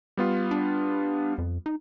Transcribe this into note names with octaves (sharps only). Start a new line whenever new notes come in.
G3 B3 F4
D4
F2
D#4